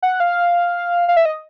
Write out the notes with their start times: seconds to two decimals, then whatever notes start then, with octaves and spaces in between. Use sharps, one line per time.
0.02 F#5
0.20 F5
1.08 F5
1.17 E5
1.25 D#5